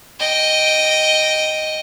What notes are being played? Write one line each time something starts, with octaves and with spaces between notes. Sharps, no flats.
D#5 G5